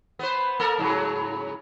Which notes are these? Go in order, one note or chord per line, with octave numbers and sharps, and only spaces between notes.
B3 B4 C5
A#3 A4 A#4
G#2 C#3 F#3